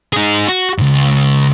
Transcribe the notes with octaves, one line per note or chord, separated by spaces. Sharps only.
D#4 G#4
F#4
C#2 G#2